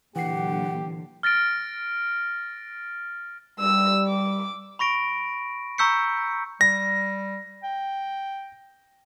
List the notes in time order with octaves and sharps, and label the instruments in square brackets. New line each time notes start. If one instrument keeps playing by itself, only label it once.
[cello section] A#2 D3 F#3 [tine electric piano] E3 C7 [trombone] G4 [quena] F#5
[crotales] F6 A6 A#6 D7
[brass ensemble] G3 [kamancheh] E6
[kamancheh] D6
[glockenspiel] B5 C#6 A#6 D7
A#5 C#6 E6 G6 B6 C#7
[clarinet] G3 [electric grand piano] A#6
[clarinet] G5